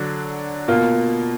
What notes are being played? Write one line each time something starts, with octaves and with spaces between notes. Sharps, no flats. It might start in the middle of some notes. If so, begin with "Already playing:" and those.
Already playing: D3 F#3 D4
B2 A#3 F4